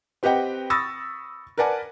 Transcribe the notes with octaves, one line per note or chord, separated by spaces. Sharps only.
C4 G4 B4 D#5 F#5 G5
B5 C#6 D#6 E6 A6 A#6
A#4 B4 D5 F#5 G#5 A5